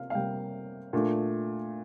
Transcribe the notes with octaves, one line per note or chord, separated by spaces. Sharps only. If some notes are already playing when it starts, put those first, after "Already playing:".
Already playing: C3 A#3 F5
F5
C3 G3 A#3 G5
A#2 A3 D4